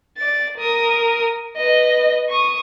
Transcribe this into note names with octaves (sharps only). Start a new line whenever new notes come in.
D5 A6
A#4 D#6
B4 D#5
C#6 D#6